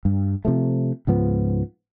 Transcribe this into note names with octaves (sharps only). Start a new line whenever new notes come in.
G2
C3 F3 A3
C#2 G#2 F3 B3